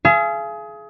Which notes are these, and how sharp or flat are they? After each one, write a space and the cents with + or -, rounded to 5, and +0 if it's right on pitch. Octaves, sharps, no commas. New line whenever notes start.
G#4 +25 F5 -40